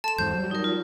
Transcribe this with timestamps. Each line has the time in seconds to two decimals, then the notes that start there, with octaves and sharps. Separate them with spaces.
0.04 A4 A5 C6 E7
0.18 E2 G#2 C5 G6
0.33 F#3 G3
0.51 D#4 A#4
0.64 F4